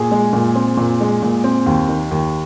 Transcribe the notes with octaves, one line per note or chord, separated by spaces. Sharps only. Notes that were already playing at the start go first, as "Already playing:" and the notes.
Already playing: A#2 G#4
G#3
A#2
C4
A#2
G#3
A#2
C4
D#2
D#3
D#2